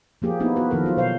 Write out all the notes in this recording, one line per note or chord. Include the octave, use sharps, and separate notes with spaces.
F3 A#3 G4 G#4
A#3 B3 D#4 E4
B3 F#4 B4
D#3 F3 A#3 A4 A#4
F#3 F4 F#4
B2 C5 F5